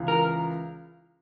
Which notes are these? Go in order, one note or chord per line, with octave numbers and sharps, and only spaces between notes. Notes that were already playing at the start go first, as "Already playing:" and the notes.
Already playing: C#2 C#3 E3
A#4